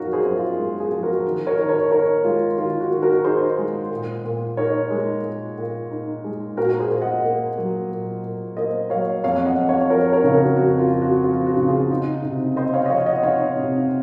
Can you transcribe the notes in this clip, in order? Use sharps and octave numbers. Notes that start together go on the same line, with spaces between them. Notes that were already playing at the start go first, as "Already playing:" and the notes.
Already playing: F#2 F3 D#4 F#4 A#4 C#5 F5
G#4 C5
F#2
F4
G#3
F4 G#4
F3
F#4 A#4
D#3
A#4 C#5
D#3
A#4 C#5
D#4 A#4 C#5
G#3 F4
D#3 F4
F#4
D#3
F#4 A#4
D#4 G#4 C5
G#3
A#2
A#2
D#4 A#4 C#5
G#3
A#2
A#2
D#4
G#3
A#2 F#4 A#4
G#4 C5
A#2
D#5 F#5
A#3
F#3
A#2
A#2
A#3 C5 D#5
F#3 C#5 F5
F2 C#5 F5
D#5 F#5
F2
C#5 F5
F3 A#4 C#5
A#4 C#5
C#3
F#4 A#4
F2 F#4
F4
F2
F#4
F3 F4
F#4
C#3
F4 G#4
D#4
C3
C4 C5 D#5
C#5 F5
D#5
F3 C#5 F5
D#5 F#5
D#4 C#5 F5
C3